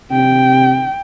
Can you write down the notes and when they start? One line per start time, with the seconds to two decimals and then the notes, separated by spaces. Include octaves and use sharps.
0.12 C3 G5